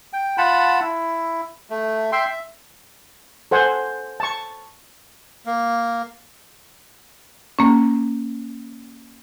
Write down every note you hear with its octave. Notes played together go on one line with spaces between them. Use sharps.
G5
F4 F#5 A5 B5
E4
A3
E5 G5 C6
E5
A4 C5 F#5 G#5
A5 C#6
A#3
A#3 C#4